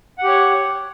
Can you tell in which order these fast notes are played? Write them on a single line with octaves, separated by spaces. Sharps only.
F#5 G4 C#5